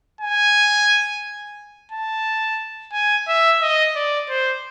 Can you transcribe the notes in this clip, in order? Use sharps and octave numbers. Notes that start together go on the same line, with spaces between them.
G#5
A5
G#5
E5
D#5
D5
C5